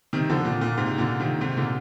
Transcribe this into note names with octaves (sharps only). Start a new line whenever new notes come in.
C3 D#3
D3 F3
A#2
A#2
G#2 C3
A#2 D3
C3 D#3
G#2 C3
A#2 D3